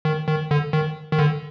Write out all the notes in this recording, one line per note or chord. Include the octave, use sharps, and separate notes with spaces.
D#3
D#3
D3
D#3
D#3
D3